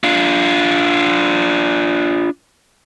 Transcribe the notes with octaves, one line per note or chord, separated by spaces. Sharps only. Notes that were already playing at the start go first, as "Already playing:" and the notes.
D4 F4